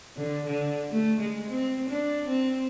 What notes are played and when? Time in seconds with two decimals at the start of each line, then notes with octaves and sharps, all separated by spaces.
0.17 D3
0.46 D3
0.91 A3
1.20 G#3
1.50 C4
1.90 D4
2.29 C4